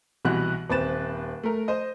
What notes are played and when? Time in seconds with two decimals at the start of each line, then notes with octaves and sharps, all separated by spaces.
0.25 C2 B2 E3 F#4 F#6
0.70 D#1 C4 B4 A6 E7
1.43 A3 A#4
1.68 C5 D#5